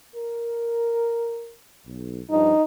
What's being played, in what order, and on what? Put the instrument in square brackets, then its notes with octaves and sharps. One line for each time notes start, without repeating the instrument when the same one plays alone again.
[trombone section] A#4
B1
[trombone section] G2 F3 [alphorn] D#4